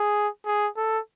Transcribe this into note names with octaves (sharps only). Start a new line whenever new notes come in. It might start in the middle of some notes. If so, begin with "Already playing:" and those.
Already playing: G#4
G#4
A4